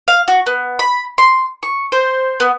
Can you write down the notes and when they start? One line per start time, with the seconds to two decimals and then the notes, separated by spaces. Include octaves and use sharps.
0.08 F5
0.28 F#4
0.46 B3
0.79 B5
1.18 C6
1.63 C#6
1.92 C5
2.40 B3